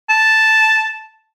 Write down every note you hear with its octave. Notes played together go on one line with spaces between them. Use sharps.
A5